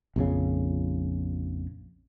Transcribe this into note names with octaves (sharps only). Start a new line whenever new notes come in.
A#1 F2 C#3